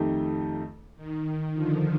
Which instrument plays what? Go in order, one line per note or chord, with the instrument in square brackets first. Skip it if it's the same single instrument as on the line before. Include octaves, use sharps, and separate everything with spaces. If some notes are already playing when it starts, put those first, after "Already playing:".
Already playing: [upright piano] F2 D#3 A3 D#4 G4
[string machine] D#3
D3 F3